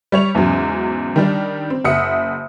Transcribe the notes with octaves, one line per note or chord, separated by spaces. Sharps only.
G3 C#5 F7
E2 G#2 C#3 F#3
D#3 G3 D4
C4
F#1 E5 F#5 D#6 C#7